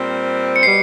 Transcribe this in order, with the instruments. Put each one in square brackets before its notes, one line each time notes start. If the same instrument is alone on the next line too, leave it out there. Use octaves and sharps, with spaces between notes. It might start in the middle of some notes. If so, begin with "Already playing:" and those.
Already playing: [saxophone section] A#2 G3 C4
[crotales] C#7
[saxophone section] B2 G3 B3 [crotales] C7